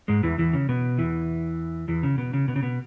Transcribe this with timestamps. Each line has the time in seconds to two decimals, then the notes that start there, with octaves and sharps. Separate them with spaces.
0.08 G#2 G#3
0.23 E2 E3
0.38 E2 E3
0.53 C#3
0.69 B2
0.98 E2 E3
1.88 E2 E3
2.03 C#3
2.18 B2
2.33 C#3
2.48 B2
2.56 C#3
2.63 B2